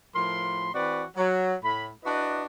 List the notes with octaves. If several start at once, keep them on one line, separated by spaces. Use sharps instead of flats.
A2 F3 A#4 B5 C6
E3 C4 F#4 B4 D5
F#3
A2 B5
D4 E4 F#4 B4 D5 D#5